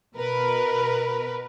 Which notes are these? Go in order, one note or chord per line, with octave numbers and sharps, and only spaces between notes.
B2 A#4 B4